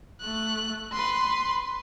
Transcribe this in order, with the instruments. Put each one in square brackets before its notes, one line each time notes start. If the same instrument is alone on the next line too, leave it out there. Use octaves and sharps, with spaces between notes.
[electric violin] A3 F#6
B4 C6